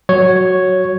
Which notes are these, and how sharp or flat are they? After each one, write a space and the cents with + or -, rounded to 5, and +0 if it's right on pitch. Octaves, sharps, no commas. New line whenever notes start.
F#3 +0 C#5 +0